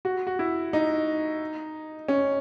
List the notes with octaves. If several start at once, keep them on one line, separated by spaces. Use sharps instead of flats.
F#4
F#4
E4
D#4
C#4